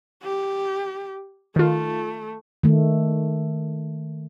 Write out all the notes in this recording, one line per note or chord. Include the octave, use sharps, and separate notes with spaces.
G4
D#3 A3 F4
D#3 A3